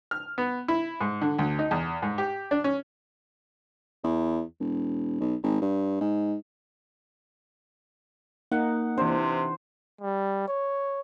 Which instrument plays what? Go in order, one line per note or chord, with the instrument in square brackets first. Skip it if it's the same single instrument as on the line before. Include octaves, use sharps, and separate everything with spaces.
[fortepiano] F6
B3
E4
G#2
D3
D2
D#4
E2
G#2
G4
D4
C#4
[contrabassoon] E2
E1
B1
G#1
G2
G#2
[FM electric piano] A#3 [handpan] D#4 [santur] F#5
[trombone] C3 [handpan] E3 D4 [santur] C5
[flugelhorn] G3
C#5